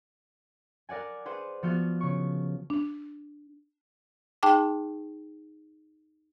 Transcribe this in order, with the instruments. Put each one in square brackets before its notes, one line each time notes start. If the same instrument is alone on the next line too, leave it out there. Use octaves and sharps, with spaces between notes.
[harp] A#4 D5 F#5 G#5
G#4 B4 C5 F#5
F3 B3 F#4 F5 G6
C#3 C#6
[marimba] D4
D#4 G#4 G5 A5 D6